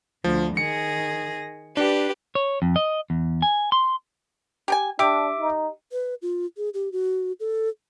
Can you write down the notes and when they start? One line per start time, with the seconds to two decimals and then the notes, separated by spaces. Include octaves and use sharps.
0.24 D2 F3
0.57 D#3 G#4 A#6 C#7
1.77 D4 G4 B4
2.35 C#5
2.62 F2
2.76 D#5
3.10 E2
3.42 G#5
3.72 C6
4.68 G4 G5 G#5
4.99 D4 G4 E5 D6
5.38 D#4
5.92 B4
6.22 F4
6.57 G#4
6.74 G4
6.92 F#4
7.40 A4